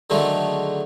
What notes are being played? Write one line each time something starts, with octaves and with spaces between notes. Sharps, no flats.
D3 D#3 F#3 G#3 A3